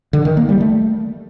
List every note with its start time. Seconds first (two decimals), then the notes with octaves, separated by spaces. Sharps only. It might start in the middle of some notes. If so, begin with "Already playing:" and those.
0.13 D3
0.25 D#3
0.37 A#3
0.49 G3
0.61 A3